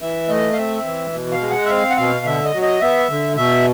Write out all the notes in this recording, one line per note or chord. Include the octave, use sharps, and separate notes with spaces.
E3 E5
A3 D#5
F5
C4 E5
E3
B2
F5
G#3
F#5
E5
C4 F5
F#5
B2 F5
D3 E5
D#5
F#3
D#5
B3 E5
D3
B2 E5